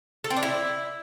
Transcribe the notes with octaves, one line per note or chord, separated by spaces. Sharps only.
A4
C4
D4
E4